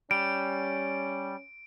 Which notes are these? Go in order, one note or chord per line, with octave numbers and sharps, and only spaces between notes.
G3 C#4 D7